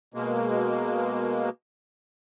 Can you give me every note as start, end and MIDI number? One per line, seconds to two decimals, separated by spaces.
0.14 1.50 47
0.14 1.50 56
0.14 1.50 58